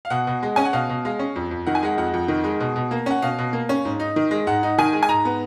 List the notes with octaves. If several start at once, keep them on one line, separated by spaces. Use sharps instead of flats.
F5
B2 F#5
B2
G#3
C#4 G#5
F#5
B2 F5
B2
G#3 F5
C#4
F2
F2
D#3 F#5
G#5
G#3 F#5
F2 F#5
F2
D#3
G#3
B2
B2
A#3
C#4 F#5
B2 F5
B2
A#3
C#4
G#2
D#4
D#3
G#3
G#2 F#5
D#4
D#3 G#5
G#3
G#5
G#2 A#5
B3